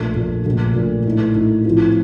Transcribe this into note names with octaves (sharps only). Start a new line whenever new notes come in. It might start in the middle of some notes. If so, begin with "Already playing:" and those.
Already playing: A#1 A#2 A3 D4
A#1 A#2 A3 D4
A#1 A#2 A3
A#1 A#2 A3
A2 A3 D#4
A2 A3 D#4
A2 F3 A3 C4 F4